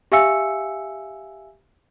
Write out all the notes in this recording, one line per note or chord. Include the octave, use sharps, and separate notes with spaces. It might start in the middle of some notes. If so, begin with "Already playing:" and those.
G4 E5 F5 G#5 E6 C#7